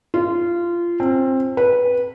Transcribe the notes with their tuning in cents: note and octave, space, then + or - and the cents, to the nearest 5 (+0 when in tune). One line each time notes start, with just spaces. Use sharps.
F4 -20
C4 +20
B4 -10